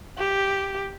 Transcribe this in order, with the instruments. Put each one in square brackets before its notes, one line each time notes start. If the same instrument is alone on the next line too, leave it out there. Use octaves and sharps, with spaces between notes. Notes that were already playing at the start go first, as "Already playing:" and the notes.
[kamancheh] G4